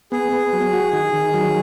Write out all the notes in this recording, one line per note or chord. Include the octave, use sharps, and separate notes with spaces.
B3 G#4
B3
F#3
F#4
D#3
D#3
F#3